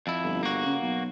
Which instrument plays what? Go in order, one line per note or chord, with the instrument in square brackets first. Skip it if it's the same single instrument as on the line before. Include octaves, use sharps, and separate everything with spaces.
[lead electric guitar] F2 E4
[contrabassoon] G1
[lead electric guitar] A#3 F#4
[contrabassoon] C#3
B1